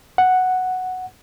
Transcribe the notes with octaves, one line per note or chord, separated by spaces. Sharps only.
F#5